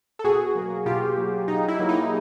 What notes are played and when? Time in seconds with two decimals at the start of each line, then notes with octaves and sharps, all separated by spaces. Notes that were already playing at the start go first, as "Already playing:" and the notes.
0.19 A4
0.24 B2 F#4 G#4
0.55 F#3 A#3
0.86 B2 F4 G4
1.17 F#3 A#3
1.48 B2 D#4
1.68 E4
1.79 F#3 A#3
1.89 D#4